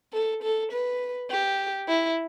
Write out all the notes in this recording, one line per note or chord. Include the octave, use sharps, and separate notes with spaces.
A4
A4
B4
G4
E4